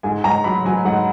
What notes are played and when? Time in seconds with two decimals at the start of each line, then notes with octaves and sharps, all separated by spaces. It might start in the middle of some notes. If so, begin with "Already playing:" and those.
0.03 G#2 G#5
0.24 G#2 A#5
0.44 F#3 B5
0.65 F#3 G#5
0.85 G#2 F#5